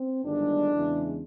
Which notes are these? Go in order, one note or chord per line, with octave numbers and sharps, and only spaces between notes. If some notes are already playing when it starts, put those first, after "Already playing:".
Already playing: C4
G1 G2 D#3 G#3 D4
E2 C#3 E3 G#3